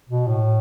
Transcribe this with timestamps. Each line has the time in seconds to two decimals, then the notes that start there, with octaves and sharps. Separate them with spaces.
0.09 B2
0.27 A2